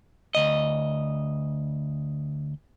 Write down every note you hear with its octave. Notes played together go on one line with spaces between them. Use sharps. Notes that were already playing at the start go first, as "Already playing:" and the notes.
D2 D#5